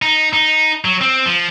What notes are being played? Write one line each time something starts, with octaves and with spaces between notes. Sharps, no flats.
D#4
D#4
F#3
C4
F3